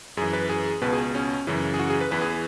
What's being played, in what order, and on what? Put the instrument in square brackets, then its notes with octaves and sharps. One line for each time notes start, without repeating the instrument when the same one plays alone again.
[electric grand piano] F#2 E3 G#4
B4
G#4
C#2 B2 B4
G#4
C#4
F#2 C#3 E3
G#4
F#4
G#4
B4
E2 E3 B4
G#4